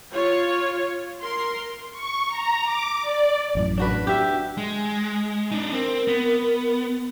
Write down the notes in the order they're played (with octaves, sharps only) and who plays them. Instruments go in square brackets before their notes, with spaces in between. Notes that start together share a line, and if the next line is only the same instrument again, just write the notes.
[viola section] F4 C#5
A#4 C6
[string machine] C#6
A#5
D6
D5
[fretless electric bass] A1 F#2 A2
[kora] D4 F#4 B4
[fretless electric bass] D4 [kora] G4 E5
[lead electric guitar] G#3
D4 D#4
[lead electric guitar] C4 [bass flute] A#4
[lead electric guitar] B3